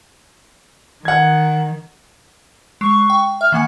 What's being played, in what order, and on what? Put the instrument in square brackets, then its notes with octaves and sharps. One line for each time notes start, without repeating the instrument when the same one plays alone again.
[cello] D#3 [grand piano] F#5 G#6
[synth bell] G#3 C7 [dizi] C#6
[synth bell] G5
[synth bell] E5 [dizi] F6
[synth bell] D#3 A#3 G#5 [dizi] F#5